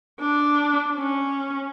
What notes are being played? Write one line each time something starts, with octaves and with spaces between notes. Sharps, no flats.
D4
C#4